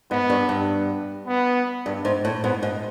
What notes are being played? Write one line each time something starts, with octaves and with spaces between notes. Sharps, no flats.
G#2 B3
G2
G2
B3
G2
G#2
A2
G#2 B3
G#2